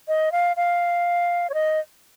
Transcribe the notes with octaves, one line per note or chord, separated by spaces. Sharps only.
D#5
F5
F5
C#5
D#5